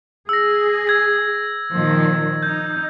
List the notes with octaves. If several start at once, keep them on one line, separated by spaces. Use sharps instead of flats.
G#4 E6 A#6
E6 G#6 A#6
A#2 D#3 F3
D#4 G6